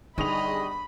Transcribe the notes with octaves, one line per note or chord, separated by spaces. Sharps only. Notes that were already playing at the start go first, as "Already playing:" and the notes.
G1 G3 D#4 G#4 D#5 B5 F7